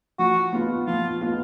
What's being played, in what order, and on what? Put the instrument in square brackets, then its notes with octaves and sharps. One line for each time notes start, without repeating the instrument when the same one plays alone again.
[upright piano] F3 [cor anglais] F#4
[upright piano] B3 F4
[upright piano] F3 [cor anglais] F4
[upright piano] B3 F4